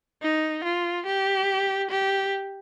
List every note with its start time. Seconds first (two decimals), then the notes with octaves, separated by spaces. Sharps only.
0.22 D#4
0.64 F4
1.06 G4
1.91 G4